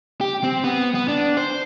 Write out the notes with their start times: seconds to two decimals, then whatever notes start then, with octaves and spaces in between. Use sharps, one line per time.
0.21 G4
0.44 C4
0.64 B3
0.95 B3
1.08 D4
1.37 C5